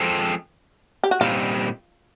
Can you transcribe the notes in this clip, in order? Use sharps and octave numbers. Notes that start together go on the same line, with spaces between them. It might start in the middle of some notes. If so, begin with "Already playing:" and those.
Already playing: F3 G#3 C4 A4
G4
F#4
A#2 G3 C4 D#4 F4